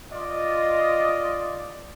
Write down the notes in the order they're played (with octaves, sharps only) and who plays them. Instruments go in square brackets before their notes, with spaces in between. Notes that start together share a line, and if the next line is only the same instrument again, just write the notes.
[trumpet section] F4 D#5 [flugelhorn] D5